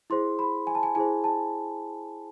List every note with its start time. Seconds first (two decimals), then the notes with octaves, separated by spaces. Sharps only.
0.10 E4 G#4 C5 C6
0.39 B5
0.67 G#5
0.75 A5
0.83 G#5
0.95 E4 G#4 C5 G#5
1.24 A5